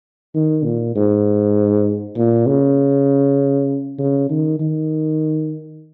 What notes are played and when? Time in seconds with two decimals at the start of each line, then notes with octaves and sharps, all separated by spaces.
0.34 D#3
0.64 A#2
0.96 G#2
2.16 A#2
2.47 C#3
3.98 C#3
4.30 D#3
4.59 D#3